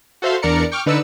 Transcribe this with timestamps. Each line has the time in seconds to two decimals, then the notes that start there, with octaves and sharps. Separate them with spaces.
0.22 F#4 A4 C5 E5 F5 C6
0.42 E2 D4 A#4 D5 A#5 C#7
0.72 G5 C#6 D6 F6
0.86 D3 D#4 B4 D5 E6 C#7